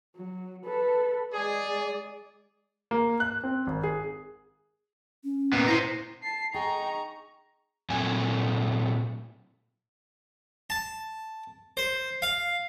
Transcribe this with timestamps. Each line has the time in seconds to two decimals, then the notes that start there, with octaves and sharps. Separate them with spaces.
0.17 F#3
0.66 A4 B4
1.34 G#3 G#4 D5
2.91 A#3
3.20 F#6
3.44 C4
3.67 G#1
3.84 G#4
5.24 C#4
5.53 A#2 B3
5.68 E4 C5 A#5
6.23 A5 C7
6.54 D#4 G#4 G5 A#5 C#6
7.90 A#2 F#3 A3 C4 G#5
10.70 A5
11.77 C5
12.22 F5